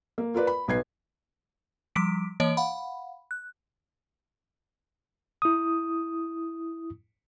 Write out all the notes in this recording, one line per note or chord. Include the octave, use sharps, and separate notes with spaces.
A#3
F4 A#4 B4 D5
B5
B1 B4 G#6 C7
F3 G3 D6 B6 D7
E3 A#3 C#5 D#5 D7
F5 F#5 B5
F#6
E4 D#6